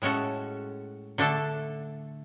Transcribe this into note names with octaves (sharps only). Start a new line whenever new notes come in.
A2 G#3 C#4 F#4 A4
D3 A3 D4 A4